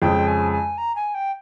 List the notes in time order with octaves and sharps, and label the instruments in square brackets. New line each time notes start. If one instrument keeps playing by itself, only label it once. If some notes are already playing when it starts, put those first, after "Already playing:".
[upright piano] F2 C#3 F3 G#3 [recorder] G5
[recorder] G#5
G#5
A#5
G#5
G5